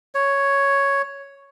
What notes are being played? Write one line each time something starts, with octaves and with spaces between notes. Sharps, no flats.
C#5